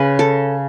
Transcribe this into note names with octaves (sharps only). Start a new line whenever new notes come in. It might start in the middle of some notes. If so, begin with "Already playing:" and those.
Already playing: C#3 B4
A4